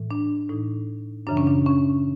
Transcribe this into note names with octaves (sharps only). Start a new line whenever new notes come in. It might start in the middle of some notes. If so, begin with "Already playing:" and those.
Already playing: A2 E3
D4
A2 E3 D#4
F#2 C#3 E3 D4
C#4
D4
C#4